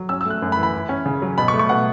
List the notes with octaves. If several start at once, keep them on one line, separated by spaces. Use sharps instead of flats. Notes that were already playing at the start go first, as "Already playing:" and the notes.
Already playing: F#3
C#4 E6
E6
A3 F#6
F#2
B5
E3
B5
E4
C#4
C#3
F#3
B2 B5
C#6
A3
C#6
B2 F#5